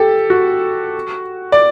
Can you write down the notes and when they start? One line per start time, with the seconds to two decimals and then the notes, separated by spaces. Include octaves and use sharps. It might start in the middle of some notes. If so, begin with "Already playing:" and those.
Already playing: G4 A4
0.30 F#4
1.52 D5